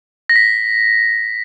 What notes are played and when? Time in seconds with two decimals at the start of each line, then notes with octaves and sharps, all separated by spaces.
0.29 A#6
0.36 B6